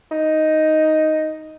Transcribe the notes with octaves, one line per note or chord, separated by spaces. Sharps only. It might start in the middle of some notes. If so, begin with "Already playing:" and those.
D#4